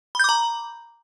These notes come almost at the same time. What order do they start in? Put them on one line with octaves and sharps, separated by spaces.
B5 G6 D6 A#5